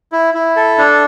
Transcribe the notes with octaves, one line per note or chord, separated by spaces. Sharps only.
E4
E4
A4
D4